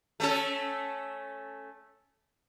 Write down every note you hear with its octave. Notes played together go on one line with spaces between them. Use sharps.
A3 C#4 A4